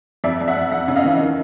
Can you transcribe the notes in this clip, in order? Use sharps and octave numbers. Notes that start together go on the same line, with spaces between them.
F2 D5 E5
F2
E5 F#5
F2
F2 E5 F#5
C#3
D#5 F5
E3
D#3